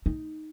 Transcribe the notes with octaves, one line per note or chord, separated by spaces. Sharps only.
D#4